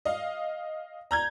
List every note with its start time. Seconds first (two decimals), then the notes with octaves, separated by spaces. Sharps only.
0.05 D#5 F5
1.11 A#5 G6 G#6